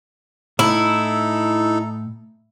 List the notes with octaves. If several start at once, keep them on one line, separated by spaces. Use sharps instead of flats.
A2 D#4 E4 A4